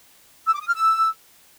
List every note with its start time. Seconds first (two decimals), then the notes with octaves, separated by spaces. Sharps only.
0.47 E6
0.54 D6
0.60 D#6
0.67 F6
0.74 E6